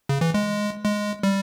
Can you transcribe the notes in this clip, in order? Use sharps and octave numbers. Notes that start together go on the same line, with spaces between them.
C#3
E3
G#3
G#3
G3